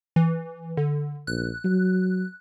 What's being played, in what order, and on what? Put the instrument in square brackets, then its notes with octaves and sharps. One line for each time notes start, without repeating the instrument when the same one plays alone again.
[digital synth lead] E3
D3
[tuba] A#1 [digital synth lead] F#6
[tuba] F#3